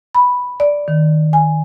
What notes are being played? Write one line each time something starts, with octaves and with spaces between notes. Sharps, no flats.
B5
D5
D#3
G#5